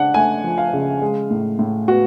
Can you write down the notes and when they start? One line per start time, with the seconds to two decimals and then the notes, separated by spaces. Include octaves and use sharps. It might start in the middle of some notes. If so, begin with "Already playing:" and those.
Already playing: C#3 D4 F#5
0.14 A3 G#5
0.44 F3
0.58 F5
0.73 C#3
1.02 G#3
1.31 A2
1.59 A2
1.88 B3 F#4